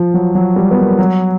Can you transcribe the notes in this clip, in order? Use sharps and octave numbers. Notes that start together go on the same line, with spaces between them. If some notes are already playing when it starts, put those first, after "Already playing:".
Already playing: F3
F#3
F#3
G3
B3
A#3
F#3